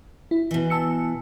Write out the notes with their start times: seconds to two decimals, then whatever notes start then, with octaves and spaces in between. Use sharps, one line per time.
0.31 E4
0.51 B2 E3
0.70 A5 E6 C#7